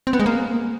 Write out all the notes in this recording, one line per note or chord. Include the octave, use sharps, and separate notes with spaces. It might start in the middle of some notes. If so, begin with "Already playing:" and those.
C4
B3
G#3
A#3